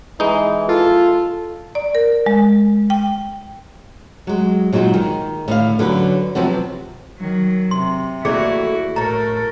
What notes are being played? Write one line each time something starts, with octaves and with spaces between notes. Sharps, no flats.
E3 G#3 D#4
F4 A4
D5
A#4
G#3
G5
F#3 G#3
A#2 F#3 G#3 D#4 F#4
D#3
A2 D3 F5
D3 F#3 C#4 B4
C3 F3 F#3 B3
D#3 F#3
C3 C6
D#2 E3 A3 E4 F#4 G#4 D5
A2 A4 A#4 C#5 A#5